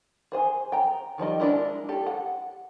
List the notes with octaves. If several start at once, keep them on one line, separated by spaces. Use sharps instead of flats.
G#4 C5 G#5
G5 A#5
D#3 F3 G3 D#5
G#3 B3 D4 E4 A#4
G4 A4
F#5